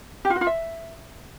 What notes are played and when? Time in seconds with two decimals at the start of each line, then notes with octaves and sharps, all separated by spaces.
0.25 G4
0.30 F4
0.36 F#4
0.41 F4
0.47 E5